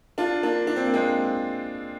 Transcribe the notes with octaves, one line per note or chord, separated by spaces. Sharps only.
D4 F4
A#3 D4
D4
C4
A#3
G#3 C4